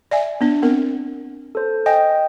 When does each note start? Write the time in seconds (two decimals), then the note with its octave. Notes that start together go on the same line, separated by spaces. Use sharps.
0.11 D5 E5 G#5
0.41 B3 D4
0.63 B3 C4 A#4
1.55 A4 C5
1.86 D#5 G5 G#5